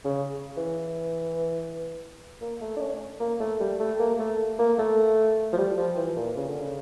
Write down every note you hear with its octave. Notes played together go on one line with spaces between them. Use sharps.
C#3
E3
A#3
A3
D4
C#4
A#3
A3
G3
A3
A#3
A3
A#3
A3
F3
G3
F3
E3
A#2
C#3
D3
C#3